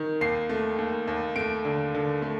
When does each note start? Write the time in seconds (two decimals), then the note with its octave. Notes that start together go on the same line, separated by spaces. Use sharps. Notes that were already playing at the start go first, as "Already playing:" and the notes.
Already playing: D#3
0.21 D#2 C7
0.49 A3
0.78 D#2
1.08 D#2
1.36 A3 D7
1.65 D3
1.94 D3
2.22 A3